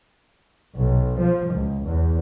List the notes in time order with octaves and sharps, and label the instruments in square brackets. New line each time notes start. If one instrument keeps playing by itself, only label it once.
[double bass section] B1
F3
C#2
E2